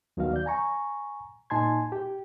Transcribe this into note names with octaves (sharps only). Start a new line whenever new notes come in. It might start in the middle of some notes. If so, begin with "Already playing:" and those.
D#2 D#3 F#3 B3 F#4 F5
D5 G6
G#5 A#5 C#6
A#2 D#4 G#5 A5 C6 G#6
G4